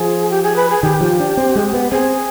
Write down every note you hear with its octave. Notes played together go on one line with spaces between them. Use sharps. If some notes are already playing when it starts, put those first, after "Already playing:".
Already playing: F3 G#4
G4
G#4
B4
G#4
D#3 G4
F3
D4
C4
G#3
B3
C4 G#4